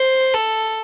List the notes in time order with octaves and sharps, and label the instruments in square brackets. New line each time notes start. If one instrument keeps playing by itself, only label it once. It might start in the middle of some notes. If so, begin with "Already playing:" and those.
Already playing: [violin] C5
A4